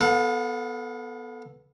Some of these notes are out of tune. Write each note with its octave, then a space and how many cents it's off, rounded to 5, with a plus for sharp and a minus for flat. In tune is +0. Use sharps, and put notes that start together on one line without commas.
B3 +0 A4 +0 F5 +45